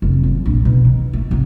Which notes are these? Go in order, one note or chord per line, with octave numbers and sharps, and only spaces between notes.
F1
F#2
A#1
B2
D#3
A3
C2